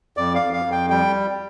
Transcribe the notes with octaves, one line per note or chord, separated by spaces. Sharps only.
F2 D5
F5
F2
F5
F2
G5
G3 G5